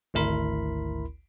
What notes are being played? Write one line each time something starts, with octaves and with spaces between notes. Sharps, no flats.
G#1 D2 E4 A#4 B5 C6